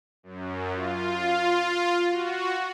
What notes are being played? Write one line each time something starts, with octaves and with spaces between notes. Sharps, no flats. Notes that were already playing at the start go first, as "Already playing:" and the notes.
F#2
F4
F#4